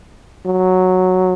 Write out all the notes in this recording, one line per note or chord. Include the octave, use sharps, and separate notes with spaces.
F#3